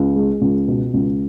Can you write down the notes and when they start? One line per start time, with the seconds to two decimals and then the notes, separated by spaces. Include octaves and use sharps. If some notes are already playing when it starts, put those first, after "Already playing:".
Already playing: C#2
0.16 G#3
0.41 C#2
0.68 B2
0.93 C#2